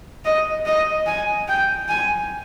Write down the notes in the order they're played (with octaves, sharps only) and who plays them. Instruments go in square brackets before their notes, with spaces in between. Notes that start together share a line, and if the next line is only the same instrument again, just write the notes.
[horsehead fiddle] D#5
D#5
G#5
G5
G#5